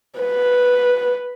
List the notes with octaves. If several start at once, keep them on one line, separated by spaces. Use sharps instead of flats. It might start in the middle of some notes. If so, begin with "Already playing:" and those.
B4